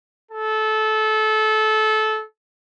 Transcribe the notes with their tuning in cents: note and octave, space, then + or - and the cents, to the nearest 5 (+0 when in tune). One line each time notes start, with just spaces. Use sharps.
A4 -20